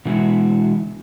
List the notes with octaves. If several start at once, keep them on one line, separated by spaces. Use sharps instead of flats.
B2 D3 E3 G#3 E4 F#4